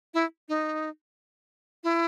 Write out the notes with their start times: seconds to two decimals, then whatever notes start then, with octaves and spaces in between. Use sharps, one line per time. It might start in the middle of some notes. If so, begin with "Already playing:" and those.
0.14 E4
0.49 D#4
1.84 E4